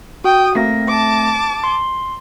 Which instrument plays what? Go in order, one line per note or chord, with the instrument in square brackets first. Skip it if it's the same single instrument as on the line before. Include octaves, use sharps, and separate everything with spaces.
[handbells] F#4 [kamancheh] G5 D#6
[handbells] A3 C4 A#6 [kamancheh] A#3
[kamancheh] A5 D6
[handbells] C6